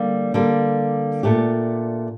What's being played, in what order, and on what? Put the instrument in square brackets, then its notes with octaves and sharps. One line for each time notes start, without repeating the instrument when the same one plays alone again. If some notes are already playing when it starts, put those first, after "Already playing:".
Already playing: [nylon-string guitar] D3 G3 A#3
D3 G3 A#3
A#2 A3 D4 G4